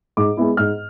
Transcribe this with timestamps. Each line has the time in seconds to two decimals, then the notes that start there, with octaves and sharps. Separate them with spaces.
0.17 G#2 D6
0.37 G#3 B3 E4
0.57 G#2 F6